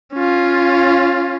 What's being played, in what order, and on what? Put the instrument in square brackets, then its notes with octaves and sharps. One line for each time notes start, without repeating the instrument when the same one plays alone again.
[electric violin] C#4 F4